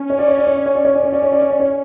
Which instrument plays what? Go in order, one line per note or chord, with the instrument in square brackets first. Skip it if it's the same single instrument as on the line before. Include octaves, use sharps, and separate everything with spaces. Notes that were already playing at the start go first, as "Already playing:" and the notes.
Already playing: [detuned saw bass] C#4
[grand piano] C#5
D5
C#5
D5
C#5
D5
C#5
D5
C#5
D5
C#5
D5
C#5
D5
C#5
D5
C#5